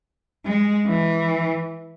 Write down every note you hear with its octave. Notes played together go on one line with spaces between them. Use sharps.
G#3
E3